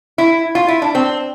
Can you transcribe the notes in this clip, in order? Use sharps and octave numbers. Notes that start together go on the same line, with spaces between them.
E4
F4
E4
D4
C4